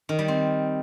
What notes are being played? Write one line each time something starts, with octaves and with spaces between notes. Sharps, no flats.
D#3
G3
C4